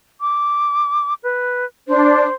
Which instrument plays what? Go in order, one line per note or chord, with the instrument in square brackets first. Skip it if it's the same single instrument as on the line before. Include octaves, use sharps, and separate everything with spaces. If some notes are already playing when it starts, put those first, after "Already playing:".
[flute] D6
B4
[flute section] D4 [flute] C5